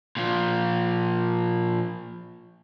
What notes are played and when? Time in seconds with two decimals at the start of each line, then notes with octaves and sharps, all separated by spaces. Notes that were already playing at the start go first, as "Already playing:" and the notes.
0.17 A#2 F3